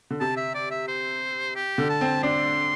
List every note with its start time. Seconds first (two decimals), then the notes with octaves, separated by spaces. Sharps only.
0.11 D3
0.20 C3 A5
0.37 E5
0.55 D5
0.71 E5
0.88 C5
1.55 G4
1.78 D3
1.89 A5
2.01 C4
2.23 D4 C6